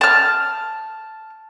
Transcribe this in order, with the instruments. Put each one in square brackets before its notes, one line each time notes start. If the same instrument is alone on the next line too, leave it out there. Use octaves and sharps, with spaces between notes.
[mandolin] A5 F6